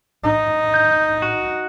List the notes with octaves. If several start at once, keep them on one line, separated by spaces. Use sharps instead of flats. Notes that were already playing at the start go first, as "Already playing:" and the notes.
D#4
G6
F#4